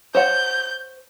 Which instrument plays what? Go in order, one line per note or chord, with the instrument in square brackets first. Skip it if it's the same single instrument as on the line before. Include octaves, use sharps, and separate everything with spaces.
[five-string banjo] C5 C#5 F#5 [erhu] G6